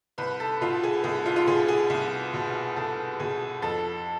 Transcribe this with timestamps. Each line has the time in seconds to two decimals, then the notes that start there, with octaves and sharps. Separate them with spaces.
0.18 C2 B4
0.40 A4
0.61 B2 F4
0.83 G#4
1.04 C2 G#4
1.25 F4
1.36 F4
1.47 B2 G#4
1.68 G#4
1.90 C2
2.33 B2
2.76 C2 A4
3.19 B2 G#4
3.62 F2 A4